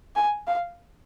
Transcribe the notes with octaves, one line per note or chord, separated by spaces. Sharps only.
G#5
F5